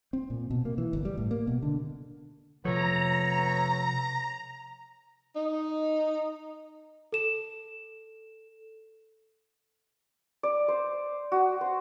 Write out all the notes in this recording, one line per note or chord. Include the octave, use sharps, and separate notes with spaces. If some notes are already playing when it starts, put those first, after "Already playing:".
C4
A#2
B2
A#3
E3
G1
G3
A2
A#3
B2
D3
C3 F3 A3 B3 C#5 A#5
D#4
A4 E7
D5
C5
F#4
C5